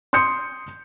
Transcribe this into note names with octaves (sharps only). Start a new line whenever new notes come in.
C6 D#6 G6 C#7